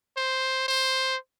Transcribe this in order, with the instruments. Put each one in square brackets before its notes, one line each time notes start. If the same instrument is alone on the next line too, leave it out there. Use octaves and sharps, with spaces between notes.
[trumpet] C5
C5